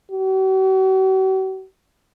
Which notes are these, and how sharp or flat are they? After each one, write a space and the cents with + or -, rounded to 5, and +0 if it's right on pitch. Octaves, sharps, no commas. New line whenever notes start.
F#4 +45